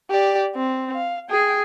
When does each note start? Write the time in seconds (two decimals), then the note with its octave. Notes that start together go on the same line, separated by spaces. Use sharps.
0.11 G4 D5
0.56 C4
0.95 F5
1.30 G#4 G5